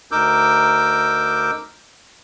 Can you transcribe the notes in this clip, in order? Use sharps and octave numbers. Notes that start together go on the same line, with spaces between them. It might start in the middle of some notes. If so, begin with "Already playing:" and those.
D2 D#4 A#4 D6 E6 G6